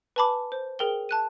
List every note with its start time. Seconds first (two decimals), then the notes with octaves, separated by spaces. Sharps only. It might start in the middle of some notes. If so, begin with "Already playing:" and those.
0.16 B4 G#5 A5 B5 D6
0.52 C5
0.79 G#4 A#4 G5 G7
1.09 A5 F#6 D#7